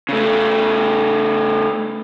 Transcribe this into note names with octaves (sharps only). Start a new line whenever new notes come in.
C#3 A3